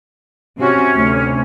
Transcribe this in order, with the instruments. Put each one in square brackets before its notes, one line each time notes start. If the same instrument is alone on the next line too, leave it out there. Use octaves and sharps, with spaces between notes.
[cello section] C3 F#4 [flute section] C#4
[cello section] D2 C3